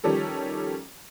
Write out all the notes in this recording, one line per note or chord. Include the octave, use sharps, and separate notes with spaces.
D#3 F3 G3 C#4 G4 A4